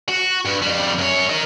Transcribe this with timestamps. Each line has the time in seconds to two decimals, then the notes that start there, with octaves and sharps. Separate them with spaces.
0.09 F#4
0.45 G2
0.62 F2 G3
0.99 F#2 C#5
1.30 A#4 D#5